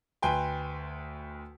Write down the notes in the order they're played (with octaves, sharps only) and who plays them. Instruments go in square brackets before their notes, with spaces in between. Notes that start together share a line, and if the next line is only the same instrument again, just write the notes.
[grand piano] D2 B4 G5 G#5 C6